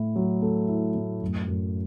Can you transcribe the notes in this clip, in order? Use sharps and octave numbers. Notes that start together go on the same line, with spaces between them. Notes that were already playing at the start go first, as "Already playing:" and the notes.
Already playing: A2 E4
F#3
A3
E4
A2
F#2
F#2